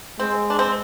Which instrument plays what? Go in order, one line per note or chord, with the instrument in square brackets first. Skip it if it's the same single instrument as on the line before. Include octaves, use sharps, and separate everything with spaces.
[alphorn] G#3 [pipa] C4
[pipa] D4
C4